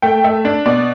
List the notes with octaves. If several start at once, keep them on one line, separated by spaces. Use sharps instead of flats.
A3 G5
A3 E5
D4
B2 D5